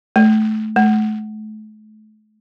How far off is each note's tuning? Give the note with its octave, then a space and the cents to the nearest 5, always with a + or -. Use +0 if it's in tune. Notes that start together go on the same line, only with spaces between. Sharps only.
A3 -20
A3 -40